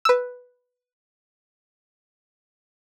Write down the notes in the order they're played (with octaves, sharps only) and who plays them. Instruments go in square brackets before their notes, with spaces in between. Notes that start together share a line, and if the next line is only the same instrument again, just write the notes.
[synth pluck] B4 E6